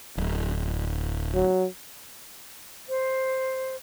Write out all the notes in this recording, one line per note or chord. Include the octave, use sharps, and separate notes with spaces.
D1
F#3
C5